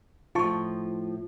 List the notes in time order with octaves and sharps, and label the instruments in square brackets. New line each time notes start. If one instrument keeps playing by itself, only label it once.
[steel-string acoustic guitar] A2 F3 [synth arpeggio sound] F4 A5 C#6